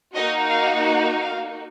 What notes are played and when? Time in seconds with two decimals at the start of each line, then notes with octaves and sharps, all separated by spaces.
0.13 A#3 D#4 F#4 D#5
0.48 F5
0.84 F#5
1.21 F5